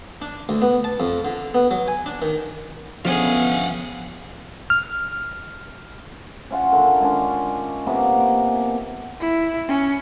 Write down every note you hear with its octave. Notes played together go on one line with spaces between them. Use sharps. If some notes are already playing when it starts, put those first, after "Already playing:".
D4
D2
B3
A5
F2
D3
B3
F#3
G#5
D4
D#3
D3 F3 B3 C#4 G#4 F5 F#5
F6
C#4 F4 F#5
D3 D#3
G#3 C#4 D4
C3 A#3 B3 D6
E4
C#4